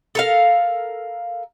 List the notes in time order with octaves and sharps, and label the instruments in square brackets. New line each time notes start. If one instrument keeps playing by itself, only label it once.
[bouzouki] A4 A#4 F5